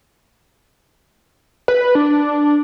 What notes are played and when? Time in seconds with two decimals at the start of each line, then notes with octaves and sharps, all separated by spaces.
1.68 B4
1.95 D4